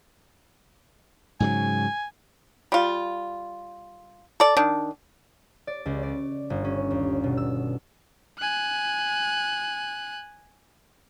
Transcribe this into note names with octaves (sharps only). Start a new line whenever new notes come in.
G#2 C#3 F#3 G#5
G3 F4
A4 D5
D#3 D4
D5
C#2
D5
G1
C#4
D#2
B2
E6
G#5 F#6